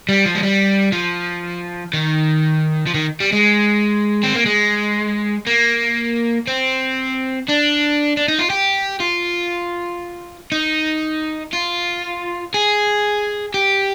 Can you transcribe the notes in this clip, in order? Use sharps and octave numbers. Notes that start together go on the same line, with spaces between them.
G3
F3
G#3
G3
F3
D#3
F3
D#3
G3
G#3
C4
A#3
G#3
A#3
C4
D4
D4
D#4
F4
G4
F4
D#4
F4
G#4
G4